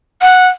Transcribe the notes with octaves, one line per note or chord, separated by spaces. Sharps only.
F#5